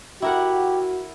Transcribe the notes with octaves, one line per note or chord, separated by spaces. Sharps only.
E4 F#4 G4 A#4 F#5